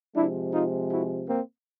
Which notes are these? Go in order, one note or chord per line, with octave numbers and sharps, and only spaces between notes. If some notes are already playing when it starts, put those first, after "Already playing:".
C3 F3 G#3 D4 E4
D#4 F4
E4 F#4
A#3 C4